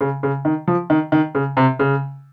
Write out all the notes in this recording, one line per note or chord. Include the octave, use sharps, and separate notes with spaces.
C#3
C#3
D#3
F3
D#3
D#3
C#3
C3
C#3